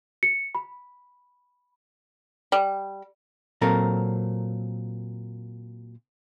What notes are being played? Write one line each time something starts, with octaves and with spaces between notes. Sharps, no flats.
C#7
B5
G3
A#2 F#3 C4 A4 A#4